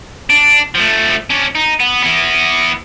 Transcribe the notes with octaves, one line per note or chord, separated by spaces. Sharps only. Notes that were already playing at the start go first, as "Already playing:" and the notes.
D4
F3 A3
C#4 D4
D#4
B3
E3 B3